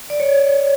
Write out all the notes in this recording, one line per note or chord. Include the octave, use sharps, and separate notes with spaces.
D5
C#5